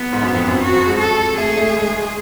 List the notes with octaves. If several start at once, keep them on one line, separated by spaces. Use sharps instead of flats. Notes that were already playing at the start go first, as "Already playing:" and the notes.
Already playing: B3
G#2
F#2
F2
F#2
F#4
F3
G#3
A4
A3 G#4
A3
G#3